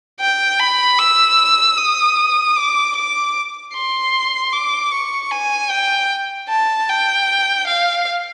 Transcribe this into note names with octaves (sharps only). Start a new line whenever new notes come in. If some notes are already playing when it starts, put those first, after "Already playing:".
G5
B5
E6
D#6
D6
D6
C6
D6
C#6
G#5
G5
A5
G5
F5